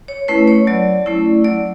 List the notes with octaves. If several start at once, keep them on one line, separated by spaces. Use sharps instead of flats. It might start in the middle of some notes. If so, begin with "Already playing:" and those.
C#5
A3 C#4 E4 B4
C#5
F#3 D5
A3 C#4 E4
F#3 D5